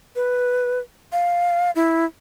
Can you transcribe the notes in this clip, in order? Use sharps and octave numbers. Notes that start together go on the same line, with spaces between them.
B4
F5
E4